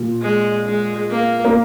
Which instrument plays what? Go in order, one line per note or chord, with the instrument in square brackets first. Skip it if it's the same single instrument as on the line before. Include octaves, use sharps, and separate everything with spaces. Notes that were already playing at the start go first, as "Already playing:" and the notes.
Already playing: [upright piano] A#2
[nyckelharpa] G#3
G#3
A#3
[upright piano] A#3